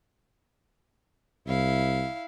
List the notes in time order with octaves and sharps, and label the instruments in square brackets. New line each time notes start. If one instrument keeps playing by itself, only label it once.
[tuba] C2 [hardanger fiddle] E4 F5